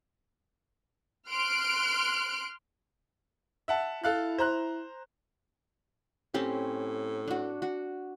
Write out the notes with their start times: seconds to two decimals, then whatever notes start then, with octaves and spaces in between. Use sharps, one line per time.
1.30 C6 F6 F#6 D7
3.68 E5 F#5 A5
4.04 E4 A4 F5 F#6
4.38 C5 A#5 F#6
6.34 A2 C4 C#4 G4
7.28 D4 F#4
7.62 F#4